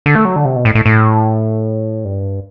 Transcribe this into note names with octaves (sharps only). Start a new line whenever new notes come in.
D3
A3
F#3
D3
C3
B2
A2
A2
A2
G2